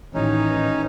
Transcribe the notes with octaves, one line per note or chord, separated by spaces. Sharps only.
A1 D#3 E3 C#4 D#4